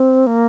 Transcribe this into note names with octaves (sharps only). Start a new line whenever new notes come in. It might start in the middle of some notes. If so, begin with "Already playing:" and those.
Already playing: C4
A#3